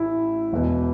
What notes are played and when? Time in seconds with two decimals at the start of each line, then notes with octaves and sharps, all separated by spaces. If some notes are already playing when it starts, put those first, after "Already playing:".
Already playing: A1 A2 E4
0.52 E1 E2 B2